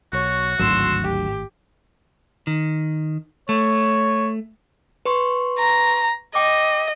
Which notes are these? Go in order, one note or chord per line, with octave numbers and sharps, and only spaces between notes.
B1 F#4 C#5
D1 G#1 D2 A2 F#3 C6 E6
G4
D#3
A3 C#5
B4 C6 C#6
A#5
D#5 G5 D6